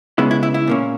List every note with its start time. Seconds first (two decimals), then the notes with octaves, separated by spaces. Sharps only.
0.18 C#3 G#3 B3 E4
0.31 E4
0.43 E4
0.54 E4
0.67 A#2 A#3 C#4